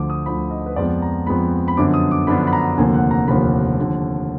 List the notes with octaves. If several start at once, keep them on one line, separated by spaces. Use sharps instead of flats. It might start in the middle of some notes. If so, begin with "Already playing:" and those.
Already playing: D2 D3 F3 D6
D#6
D2 D3 F3 B5
D#5
B4
F2 F3 G#3 B3 D5
A#5
F2 F3 G#3 B3 B5
B5
F#2 D3 F3 B3 D4 D6
D#6
D6
F#2 D3 F3 B3 D4 B5
B5
A#5
F1 D#2 D3 F3 A#3 G#5
F#5
A#5
F1 D#2 D3 F3 A#3 B5
D#2 D3 F3